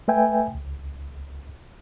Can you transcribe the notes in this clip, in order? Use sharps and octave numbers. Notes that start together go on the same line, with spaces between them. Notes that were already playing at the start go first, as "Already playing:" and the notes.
A3 B4 E5 G5 G#5
C#2